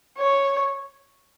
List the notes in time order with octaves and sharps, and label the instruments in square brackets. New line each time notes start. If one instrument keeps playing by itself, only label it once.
[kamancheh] C#5